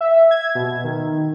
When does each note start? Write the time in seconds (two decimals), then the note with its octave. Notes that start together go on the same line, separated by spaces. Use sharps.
0.01 E5
0.31 G#6
0.55 B2
0.84 D#3